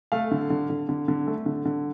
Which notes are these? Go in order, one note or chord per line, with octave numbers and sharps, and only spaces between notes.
A3 F5
D3
D3
D3
D3
D3
A3
D3
D3